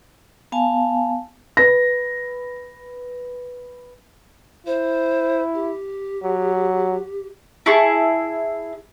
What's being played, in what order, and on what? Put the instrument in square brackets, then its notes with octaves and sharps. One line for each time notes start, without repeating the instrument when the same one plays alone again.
[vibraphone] B3 F5 G#5 A5
[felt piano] B4 A#6
[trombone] E4 [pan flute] C5
[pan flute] G4
[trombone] F#3
[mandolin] E4 G#4 A5 C#6